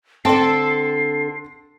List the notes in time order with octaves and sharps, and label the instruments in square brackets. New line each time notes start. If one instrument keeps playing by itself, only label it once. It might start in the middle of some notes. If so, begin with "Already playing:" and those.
[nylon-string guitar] D3 C4 [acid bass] A4 [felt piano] A5 C6 [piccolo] C7